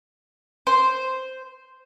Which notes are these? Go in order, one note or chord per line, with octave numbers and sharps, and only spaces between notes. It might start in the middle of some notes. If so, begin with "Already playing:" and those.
C5